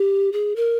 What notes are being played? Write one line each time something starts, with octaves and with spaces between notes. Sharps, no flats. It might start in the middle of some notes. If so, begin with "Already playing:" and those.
Already playing: G4
G#4
A#4